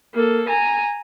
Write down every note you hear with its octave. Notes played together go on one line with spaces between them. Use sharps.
A#3 A4
G#5 A#5